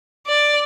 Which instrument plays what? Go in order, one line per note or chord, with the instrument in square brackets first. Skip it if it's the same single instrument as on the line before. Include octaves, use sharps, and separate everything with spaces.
[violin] D5